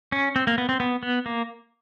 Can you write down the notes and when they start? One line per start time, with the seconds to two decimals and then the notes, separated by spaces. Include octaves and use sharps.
0.12 C#4
0.36 C4
0.47 A#3
0.58 B3
0.69 C4
0.80 B3
1.03 B3
1.26 A#3